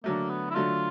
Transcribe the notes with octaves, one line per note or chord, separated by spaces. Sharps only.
D3 F#3 A3 A#3
B3
E4
D3 F#3 A3 F4